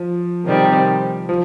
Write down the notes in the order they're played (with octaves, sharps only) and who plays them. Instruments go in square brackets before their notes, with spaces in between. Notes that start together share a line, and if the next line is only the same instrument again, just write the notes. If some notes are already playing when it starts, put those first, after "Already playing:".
Already playing: [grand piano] F3
[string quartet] C3 D#3 G3 C4
[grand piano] F3